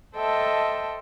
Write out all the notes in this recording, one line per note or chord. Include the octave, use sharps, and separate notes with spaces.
A4 C5 D#5 E5 G5 A5